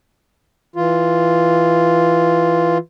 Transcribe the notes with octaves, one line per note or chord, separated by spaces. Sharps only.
E3 F4